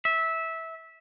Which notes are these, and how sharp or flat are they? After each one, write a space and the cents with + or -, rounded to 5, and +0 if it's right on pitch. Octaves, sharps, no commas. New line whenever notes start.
E5 -15